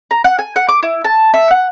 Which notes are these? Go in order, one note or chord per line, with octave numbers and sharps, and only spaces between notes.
A#5
F#5
G#5
F#5
D6
E4
A5
E5
F#5